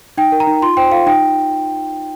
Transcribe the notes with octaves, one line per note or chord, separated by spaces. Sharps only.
D#4 G5
A#4
A#5
D#4
F4 C6
C5 G5
F4 F5
D#4 G5